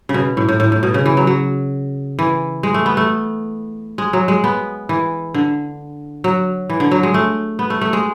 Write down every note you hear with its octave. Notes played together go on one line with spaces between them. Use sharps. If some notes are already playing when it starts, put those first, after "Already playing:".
C#3
B2
A2
A2
A2
A2
B2
C#3
E3
F#3
F#3
E3
G#3
A3
B3
A3
G#3
F#3
G#3
B3
E3
D3
F#3
E3
D3
F#3
G#3
A3
B3
A3
A3
G#3